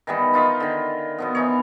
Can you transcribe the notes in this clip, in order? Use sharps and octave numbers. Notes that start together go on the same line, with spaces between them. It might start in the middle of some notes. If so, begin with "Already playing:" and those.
D#3 E3 G3 B3
D#4 F4 A#4 B5
D3 D#3
B2 F3 B3
E3 D#4 C#5